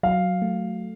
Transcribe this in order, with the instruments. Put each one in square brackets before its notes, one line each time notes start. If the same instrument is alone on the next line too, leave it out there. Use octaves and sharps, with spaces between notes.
[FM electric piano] F#3 [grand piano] F5
[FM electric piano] A3